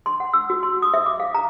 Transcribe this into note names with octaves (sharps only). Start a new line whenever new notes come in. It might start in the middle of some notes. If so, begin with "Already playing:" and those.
C6
F#5
E6
F#4
C6
D#6
E5
D6
F5
A#5